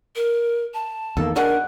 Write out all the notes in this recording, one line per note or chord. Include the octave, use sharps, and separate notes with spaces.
A#4
A5
E2 D#3 A#3 A4
B2 D4 G#4 A#4 F#5